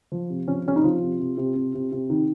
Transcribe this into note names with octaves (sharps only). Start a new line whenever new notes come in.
F3
C3
F3 C#4
C3 C#4
D#4
F3 F4
C3
C3
C3
C3
C3
C3
D#3